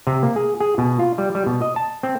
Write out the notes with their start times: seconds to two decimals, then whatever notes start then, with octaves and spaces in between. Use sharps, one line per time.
0.07 C3
0.23 A#3
0.36 G#4
0.60 G#4
0.78 B2
0.99 F4
1.18 G3
1.35 G3
1.46 B2
1.62 D#5
1.76 A5
2.03 C4